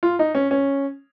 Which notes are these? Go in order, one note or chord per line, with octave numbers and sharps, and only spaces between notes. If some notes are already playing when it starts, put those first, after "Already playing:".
F4
D#4
C#4
C#4